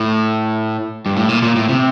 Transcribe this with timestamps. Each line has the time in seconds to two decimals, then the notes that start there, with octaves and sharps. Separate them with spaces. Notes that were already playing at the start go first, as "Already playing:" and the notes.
Already playing: A2
1.06 G2
1.17 A2
1.29 A#2
1.43 A#2
1.56 A2
1.69 C3